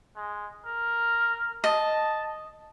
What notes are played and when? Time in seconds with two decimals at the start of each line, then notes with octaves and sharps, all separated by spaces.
0.16 G#3
0.65 A#4
1.64 D#5 A5